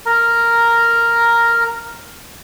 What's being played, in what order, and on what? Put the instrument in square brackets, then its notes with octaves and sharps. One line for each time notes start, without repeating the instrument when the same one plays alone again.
[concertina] A#4 A#5